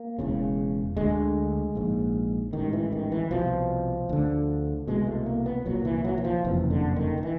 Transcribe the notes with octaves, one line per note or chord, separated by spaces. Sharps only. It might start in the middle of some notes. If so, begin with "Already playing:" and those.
Already playing: A#3
E1 E2 C#3
D2 D3 G#3
A#1 G#2
A1 G#2 D#3
E3
D#3
E3
C2 B2 F3
D2 D3
C2 B2 G#3
A3
A#3
B3
C2 A#2 F#3
E3
F#3
E3
F3
F#1 F2 C3 E3
D3
D#3
D#3
E3